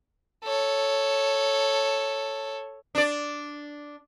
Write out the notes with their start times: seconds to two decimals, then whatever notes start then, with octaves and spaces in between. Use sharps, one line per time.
0.44 A4 C#5
2.95 D4 D5